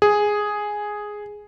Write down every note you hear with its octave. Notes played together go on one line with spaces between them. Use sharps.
G#4